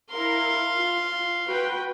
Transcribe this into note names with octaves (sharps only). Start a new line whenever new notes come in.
E4 A#4 F5 C6
F4
F#4 B4 G5